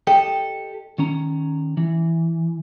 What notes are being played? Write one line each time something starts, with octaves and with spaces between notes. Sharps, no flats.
G4 A4 D#5 G5
D#3 C#4 A#5
E3